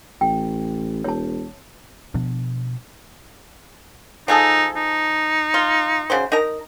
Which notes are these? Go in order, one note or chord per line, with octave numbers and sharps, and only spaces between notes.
A1 G5
E1 C#5 A5
B2 F3 B3 D4
F3 D#4 G#4 A4
D#4
F4
C#3 F#4 C5
D#4 A#4 A#5